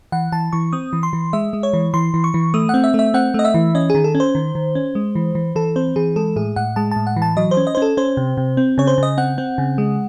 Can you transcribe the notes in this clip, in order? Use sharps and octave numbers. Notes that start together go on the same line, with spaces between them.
E3 F#5
E3 A5
E3 C#6
C4 D#6
E3
C6
E3
G#3 E5
G#3
C#5
E3
E3 C6
E3
C#6
E3
A3 D#6
C4 F#5
E5
A3 E5
C4 F#5
A3 D#5
E5
E3
C#4 D#5
D#3 G#4
A4
C#4
C5
D#3
D#3
C#4
G#3
E3
E3
E3 A4
C4 C5
E3 G#4
G#3 A4
A2 G#4
A2 F#5
G#3 A5
A2 A5
F#5
E3
A5
F#3 D#5
C5
C#4
D#5
C5
C#4 A4
C#4 C5
C3
C3
C4
C#3 C#5
C5
C#3 D#5
C4 F#5
C4
C#3
G#3